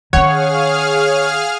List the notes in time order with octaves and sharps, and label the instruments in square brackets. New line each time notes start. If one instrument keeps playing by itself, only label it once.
[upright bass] D#3 C#4 [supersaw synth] G#4 F5 F6 [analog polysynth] C#5 [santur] F#5